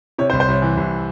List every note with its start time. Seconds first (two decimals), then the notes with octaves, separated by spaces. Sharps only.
0.18 C3 C#5
0.30 C5
0.33 C2
0.40 C5
0.48 C2 C#5
0.62 E3
0.77 C2